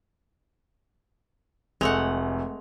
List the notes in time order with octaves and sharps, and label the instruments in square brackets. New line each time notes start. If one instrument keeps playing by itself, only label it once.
[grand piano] F1 F7 [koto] G#3 A3 F#5